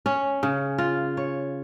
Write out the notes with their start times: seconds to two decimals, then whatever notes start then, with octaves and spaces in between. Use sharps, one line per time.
0.06 C#4
0.43 C#3
0.78 F4
1.17 C#5